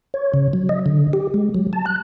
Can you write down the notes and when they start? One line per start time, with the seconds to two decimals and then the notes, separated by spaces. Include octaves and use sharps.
0.14 C#5
0.34 C#3
0.53 F#3
0.69 D#5
0.86 D3
1.13 G4
1.34 G#3
1.54 F#3
1.73 A5
1.86 F#6